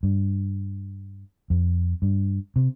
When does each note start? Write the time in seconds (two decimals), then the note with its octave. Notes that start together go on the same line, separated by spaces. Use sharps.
0.03 G2
1.50 F2
2.02 G2
2.56 C3